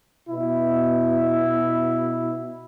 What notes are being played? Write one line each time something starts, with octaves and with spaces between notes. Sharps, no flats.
B2 E4